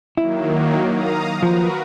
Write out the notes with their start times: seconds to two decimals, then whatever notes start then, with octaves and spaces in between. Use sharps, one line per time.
0.17 D#3 F#3 A#3 E4
0.91 F5 A#5 D#6
1.43 F3 F#4 A#4 B4